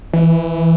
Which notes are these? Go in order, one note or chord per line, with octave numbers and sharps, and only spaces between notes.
E3